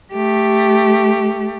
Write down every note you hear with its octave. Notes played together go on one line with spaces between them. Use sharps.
A3 G4